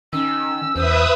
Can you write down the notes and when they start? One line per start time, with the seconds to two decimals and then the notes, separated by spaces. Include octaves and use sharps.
0.13 D#3 C#4 E6
0.76 E2 B4 C5 E5 D#6